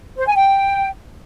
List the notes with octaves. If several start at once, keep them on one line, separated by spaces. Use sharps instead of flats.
C5
G#5
G5